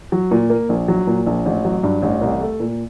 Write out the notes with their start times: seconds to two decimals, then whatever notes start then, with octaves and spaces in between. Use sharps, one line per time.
0.12 F#3
0.31 A#2
0.50 A#3
0.69 A#1
0.88 F#3
1.07 A#2
1.27 A#1
1.46 A1
1.65 F#3
1.84 G2
2.02 A1
2.21 C2
2.41 A3
2.60 A#2